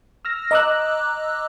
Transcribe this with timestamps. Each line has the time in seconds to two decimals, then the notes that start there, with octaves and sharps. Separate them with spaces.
0.25 E6 F6 A#6
0.51 D#5 A#5 D6 E6 F#6